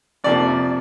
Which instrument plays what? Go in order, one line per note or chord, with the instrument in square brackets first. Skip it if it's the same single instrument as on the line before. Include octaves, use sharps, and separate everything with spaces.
[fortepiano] F2 C3 F3 A#3 D5